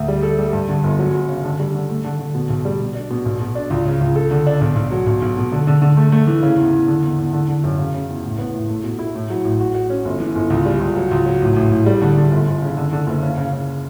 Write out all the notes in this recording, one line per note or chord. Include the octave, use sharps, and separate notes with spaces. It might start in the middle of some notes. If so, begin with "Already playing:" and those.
Already playing: D2
G3
A4
G3
G2
D3
G1
F#3
F#3
C#3
D3
G3
D3
A3
D3
D3
B2
B1
G3
B2
D4
B2
B1
B2
D4
C#2
C#3
C#2
A4
D3
D4
B1
B1
F#3
B1
B1
B2
D3
D3
D3
A3
A3
E3
C#3
E2
E2
D3
E2
E2
D3
D3
F#2
C#3
C#3
E2
A1
B3
A1
A3
B2
E4
A2
F#3
A1
F#4
F#4
C#4
G1
E3
G1
C#2
G3
C#2
F#3
C#2
F#3
A1
A1
A1
G3
D3
D3
G1
G1
C#3
D3
D3
F#1
C#3
C#3
C#3